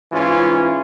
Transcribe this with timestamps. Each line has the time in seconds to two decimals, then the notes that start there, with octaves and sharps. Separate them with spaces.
0.12 G#2 E3 C#4 F4